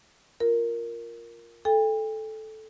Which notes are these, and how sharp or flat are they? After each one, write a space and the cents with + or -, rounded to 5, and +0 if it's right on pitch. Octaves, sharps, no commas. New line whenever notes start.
F4 +0 A#4 +0
A4 -10 G5 +40